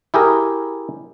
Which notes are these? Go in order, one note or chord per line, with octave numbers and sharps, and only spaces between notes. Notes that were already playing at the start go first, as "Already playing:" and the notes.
E4 G4 G#4 A#4